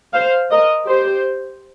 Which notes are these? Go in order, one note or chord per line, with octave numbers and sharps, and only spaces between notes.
C5 F5
A#4 D#5
G4 C5